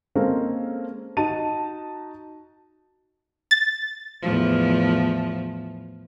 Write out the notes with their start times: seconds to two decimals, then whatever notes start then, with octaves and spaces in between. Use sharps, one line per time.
0.15 G#3 A#3 C4 C#4 A4 A#4
1.17 D#4 F#4 A5 D#7
3.51 A6
4.22 E2 A2 F3